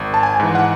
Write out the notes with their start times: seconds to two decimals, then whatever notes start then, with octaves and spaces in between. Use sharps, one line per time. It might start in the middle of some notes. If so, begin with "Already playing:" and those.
Already playing: G#1
0.14 A5
0.23 G#5
0.40 G#2 E3
0.55 F#5